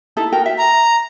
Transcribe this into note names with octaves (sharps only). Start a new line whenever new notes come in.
D#4 E4 A4
F#4 A#4 G5
E5
A#5